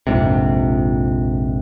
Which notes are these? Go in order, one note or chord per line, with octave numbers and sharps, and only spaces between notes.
A#1 F2 G#2 C3